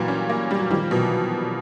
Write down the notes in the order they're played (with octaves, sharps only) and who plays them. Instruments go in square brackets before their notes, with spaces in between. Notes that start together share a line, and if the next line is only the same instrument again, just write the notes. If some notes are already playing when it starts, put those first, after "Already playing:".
Already playing: [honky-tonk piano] A#2 G3 A#3 [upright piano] E3 F#3
[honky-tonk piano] C#4
A#3
G3
[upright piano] F#3
[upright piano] D#3 F3 [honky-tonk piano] G3
[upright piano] F3
[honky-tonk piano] B2 [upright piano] E3 F#3